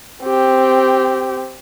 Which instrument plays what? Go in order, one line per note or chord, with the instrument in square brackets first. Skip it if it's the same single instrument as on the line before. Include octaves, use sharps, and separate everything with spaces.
[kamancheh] C4 G4